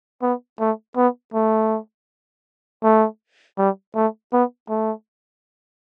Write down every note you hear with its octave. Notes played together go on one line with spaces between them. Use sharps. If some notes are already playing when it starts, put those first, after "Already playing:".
B3
A3
B3
A3
A3
G3
A3
B3
A3